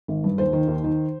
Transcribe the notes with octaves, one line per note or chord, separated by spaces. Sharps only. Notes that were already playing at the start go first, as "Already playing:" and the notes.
G#1
G2
D#2 C5
D#3
D#2
D#3